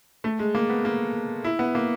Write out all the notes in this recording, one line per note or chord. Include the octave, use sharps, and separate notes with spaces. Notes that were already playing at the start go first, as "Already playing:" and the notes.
A3
G#3
A#3
B3
A#3
E4
B3
A#3